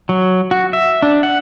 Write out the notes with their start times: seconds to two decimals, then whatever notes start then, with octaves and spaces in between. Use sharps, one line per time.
0.09 F#3
0.51 F#4
0.73 E5
1.02 D4
1.23 F#5